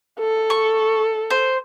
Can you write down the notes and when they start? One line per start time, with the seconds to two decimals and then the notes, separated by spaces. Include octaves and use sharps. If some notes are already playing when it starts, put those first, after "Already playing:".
0.19 A4
0.50 C#6
1.30 C5